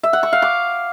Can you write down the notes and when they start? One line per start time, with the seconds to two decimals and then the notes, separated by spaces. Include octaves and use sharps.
0.03 E5
0.13 F#5
0.23 C#6
0.33 F5
0.42 D6